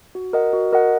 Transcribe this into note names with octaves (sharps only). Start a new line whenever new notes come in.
F#4
A#4 D#5 F#5
F#4
A#4 D#5 F#5